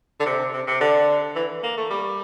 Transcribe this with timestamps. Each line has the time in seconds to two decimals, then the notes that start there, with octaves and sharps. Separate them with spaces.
0.20 D3
0.26 C3
0.54 C3
0.67 C3
0.81 D3
1.36 E3
1.63 A#3
1.77 A3
1.90 G3